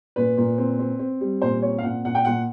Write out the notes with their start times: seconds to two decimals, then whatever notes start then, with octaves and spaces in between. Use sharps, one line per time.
0.16 A#2 B4
0.37 A#2
0.58 C4
0.79 C4
0.99 C4
1.21 G3
1.42 A#2 C5
1.62 C4 C#5
1.78 F5
1.83 A#2 F#5
2.04 A#2 F#5
2.15 G5
2.25 A#2 F#5